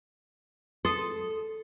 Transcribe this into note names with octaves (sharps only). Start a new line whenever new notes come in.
A4 C6 D#6